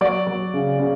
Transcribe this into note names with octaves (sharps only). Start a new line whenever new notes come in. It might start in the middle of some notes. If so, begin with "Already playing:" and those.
F#3 D5
F#3
C#3
C#3